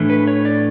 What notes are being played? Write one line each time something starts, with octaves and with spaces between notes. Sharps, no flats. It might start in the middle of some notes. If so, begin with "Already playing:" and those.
Already playing: A2 E3 A3 D4
B4
C#5
D5